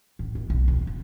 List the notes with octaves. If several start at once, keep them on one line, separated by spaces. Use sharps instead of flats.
A1
D#2
B1
D#2
F2